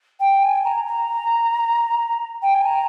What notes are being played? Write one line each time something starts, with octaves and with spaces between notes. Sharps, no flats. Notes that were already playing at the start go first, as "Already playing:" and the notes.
G5
G#5
A#5
A#5
G5
G#5
A#5